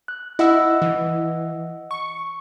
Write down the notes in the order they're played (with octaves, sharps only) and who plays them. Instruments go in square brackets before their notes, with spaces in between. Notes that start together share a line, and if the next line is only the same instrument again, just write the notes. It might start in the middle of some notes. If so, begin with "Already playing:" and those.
[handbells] F#6
[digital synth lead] E4 [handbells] D#5 F#5 E6
[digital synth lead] E3
C#6